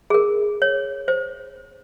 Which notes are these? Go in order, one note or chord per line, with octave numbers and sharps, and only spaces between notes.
G#4
A#4
C#5
C5